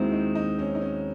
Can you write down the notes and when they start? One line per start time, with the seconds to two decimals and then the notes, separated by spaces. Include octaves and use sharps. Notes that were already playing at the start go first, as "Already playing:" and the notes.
Already playing: D#2 D#3 G#3 C4 E4 F#4
0.12 D#4
0.35 D#4
0.59 C#4
0.75 D#4
0.81 C#4